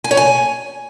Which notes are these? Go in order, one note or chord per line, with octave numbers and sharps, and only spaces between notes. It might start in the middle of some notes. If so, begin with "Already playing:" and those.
G#5
C#5
G#5